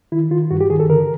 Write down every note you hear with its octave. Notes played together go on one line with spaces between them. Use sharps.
D#3 E4
D#3 F4
G2 F#4
G4
D#3 G#4
A4
D3 A#4